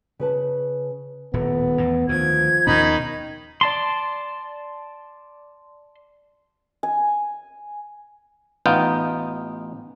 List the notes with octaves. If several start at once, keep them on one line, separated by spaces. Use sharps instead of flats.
C#3 B4 A5
D#1 A2 B3
E2 A2
D2 D#3 F3 G#6
D#2 B2 D#3 C#4 D#4 B5
D5 A5 C6
G#5
A1 B3 D#4 F4 G5